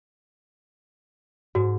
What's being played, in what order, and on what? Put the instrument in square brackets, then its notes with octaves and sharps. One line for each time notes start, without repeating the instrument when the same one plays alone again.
[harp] G#2 [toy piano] F#4